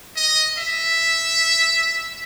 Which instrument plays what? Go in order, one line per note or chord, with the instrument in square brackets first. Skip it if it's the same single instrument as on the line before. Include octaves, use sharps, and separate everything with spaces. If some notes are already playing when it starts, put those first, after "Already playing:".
[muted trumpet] D#5
E5